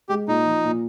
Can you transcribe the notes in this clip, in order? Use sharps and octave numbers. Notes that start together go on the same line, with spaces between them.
G#3 G4
A#2 D#4
F3
A#2